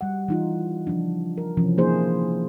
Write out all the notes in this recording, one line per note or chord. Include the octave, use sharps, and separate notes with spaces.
G3 F#5
E3 D#4 F4
C#3 F3 D4
A#4
C3 E3 F3 C#4
A#3 D4 E4 G#4 C5